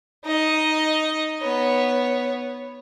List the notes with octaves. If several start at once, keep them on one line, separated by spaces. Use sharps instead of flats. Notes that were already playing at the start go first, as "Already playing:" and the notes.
D#4 D#5
B3 C#5